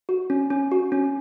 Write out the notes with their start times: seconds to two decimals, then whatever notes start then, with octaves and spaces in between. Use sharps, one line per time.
0.09 F#4
0.30 C#4
0.50 C#4
0.72 F#4
0.92 C#4